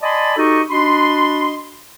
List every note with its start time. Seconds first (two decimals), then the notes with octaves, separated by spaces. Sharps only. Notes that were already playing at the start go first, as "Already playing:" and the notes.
0.01 D5 D#5 G#5 A5 B5 C6
0.37 D#4 F#4 G4 A4 D#5 C#6
0.70 D4 F#4 D#5 B5 C6